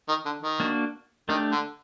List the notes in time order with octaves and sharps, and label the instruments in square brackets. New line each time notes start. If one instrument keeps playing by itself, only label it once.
[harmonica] D#3
D3
D#3
[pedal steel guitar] A#3 D4 F#4
[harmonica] D#3 [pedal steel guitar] A3 D4 G4
[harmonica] D3